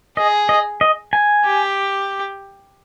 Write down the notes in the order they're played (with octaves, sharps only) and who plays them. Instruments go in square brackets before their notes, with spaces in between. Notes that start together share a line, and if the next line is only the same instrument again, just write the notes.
[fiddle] G#4 [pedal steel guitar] D#5
[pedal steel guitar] D#5
D#5
G#5
[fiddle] G4